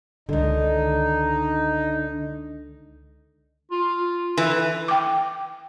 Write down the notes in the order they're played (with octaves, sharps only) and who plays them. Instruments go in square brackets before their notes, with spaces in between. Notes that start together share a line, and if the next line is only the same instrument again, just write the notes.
[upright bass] C#2 D#3 [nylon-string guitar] D3 [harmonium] D#4
[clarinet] F4
[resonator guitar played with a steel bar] E3 [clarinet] A4
[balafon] G5 D6